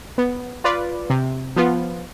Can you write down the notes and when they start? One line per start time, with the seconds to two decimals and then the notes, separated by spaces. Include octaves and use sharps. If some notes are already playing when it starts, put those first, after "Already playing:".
0.18 B3
0.64 F4 B4 D5
1.10 C3
1.56 F3 B3 F4